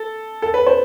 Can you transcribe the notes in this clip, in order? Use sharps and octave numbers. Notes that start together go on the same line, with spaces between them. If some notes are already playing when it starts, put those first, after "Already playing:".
Already playing: A4
A4
B4
C5